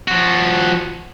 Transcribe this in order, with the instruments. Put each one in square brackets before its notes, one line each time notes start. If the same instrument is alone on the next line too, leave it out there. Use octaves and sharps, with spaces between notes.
[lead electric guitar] F3 F#4